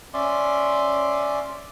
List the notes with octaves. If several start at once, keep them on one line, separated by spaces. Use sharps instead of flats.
C#4 D5 E5 C6 D6